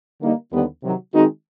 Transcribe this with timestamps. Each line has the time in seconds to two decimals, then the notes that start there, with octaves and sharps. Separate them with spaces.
0.19 D3 G3 A#3 D#4
0.51 D#2 D3 G3 B3
0.81 C3 D#3 F#3
1.12 D#3 G#3 C4 D#4 F#4